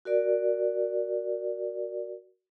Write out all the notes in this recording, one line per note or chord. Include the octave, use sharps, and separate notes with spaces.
F#4 A#4 D5